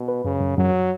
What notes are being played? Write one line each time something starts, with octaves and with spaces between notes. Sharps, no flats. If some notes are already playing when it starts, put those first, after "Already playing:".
Already playing: B2
B4
F#2 C#3
F#2
F#2 F#3